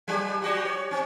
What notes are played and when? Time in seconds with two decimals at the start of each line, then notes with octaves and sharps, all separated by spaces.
0.08 F#3 G4
0.42 G3 F#4 G4
0.65 C#5
0.91 C4 C#4